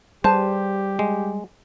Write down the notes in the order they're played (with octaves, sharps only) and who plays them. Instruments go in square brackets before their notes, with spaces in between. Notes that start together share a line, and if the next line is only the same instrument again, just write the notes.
[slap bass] G3 [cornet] G4 [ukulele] G#4 B4 A5 [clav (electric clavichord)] C5
[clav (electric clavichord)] G#3